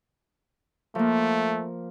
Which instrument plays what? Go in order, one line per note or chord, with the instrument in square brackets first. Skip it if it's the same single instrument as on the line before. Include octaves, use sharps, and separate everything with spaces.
[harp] F3 A#3 [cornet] A3